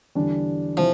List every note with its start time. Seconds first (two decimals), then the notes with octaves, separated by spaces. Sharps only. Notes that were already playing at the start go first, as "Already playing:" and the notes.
0.15 E2 D3 G3 D4
0.77 C3 E3 F3